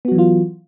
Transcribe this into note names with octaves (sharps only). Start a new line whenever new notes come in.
E3 F#3 B3 F4 F#4